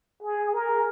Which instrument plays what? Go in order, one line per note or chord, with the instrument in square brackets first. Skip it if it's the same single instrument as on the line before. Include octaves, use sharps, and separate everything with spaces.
[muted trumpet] G#4
A#4